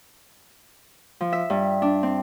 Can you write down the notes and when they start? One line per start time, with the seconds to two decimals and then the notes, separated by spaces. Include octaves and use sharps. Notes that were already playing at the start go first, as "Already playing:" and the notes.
1.21 F3
1.33 E5
1.50 G2
1.82 D4
2.03 C4